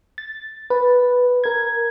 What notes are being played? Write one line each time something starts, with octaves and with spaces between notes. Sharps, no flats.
A6
B4
A#4 G#6